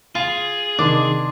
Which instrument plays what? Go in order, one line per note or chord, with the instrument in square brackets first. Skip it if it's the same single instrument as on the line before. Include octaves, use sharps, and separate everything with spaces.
[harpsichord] F4 [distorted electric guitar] G#4
[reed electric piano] C3 D#3 C6 [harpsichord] D4 [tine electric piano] D6